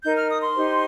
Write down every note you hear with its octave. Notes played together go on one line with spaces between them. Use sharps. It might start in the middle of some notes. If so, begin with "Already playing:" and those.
D#4 A#4 G6
F6
D#6
C6
D#4 G4 C5